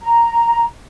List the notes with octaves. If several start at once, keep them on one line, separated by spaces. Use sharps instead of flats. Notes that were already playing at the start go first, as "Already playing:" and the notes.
A#5